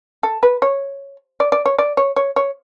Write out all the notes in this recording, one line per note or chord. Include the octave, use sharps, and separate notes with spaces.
A4
B4
C#5
D5
D5
C#5
D5
C#5
C#5
C#5